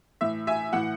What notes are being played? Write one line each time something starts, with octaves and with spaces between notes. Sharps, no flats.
A2 E3 E5
E5 G#5
A2 E3 F#5